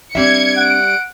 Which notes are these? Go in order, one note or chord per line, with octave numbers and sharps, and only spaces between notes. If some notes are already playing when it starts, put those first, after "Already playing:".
G3 C4 D4 E5 G#6 C#7
F#5 D7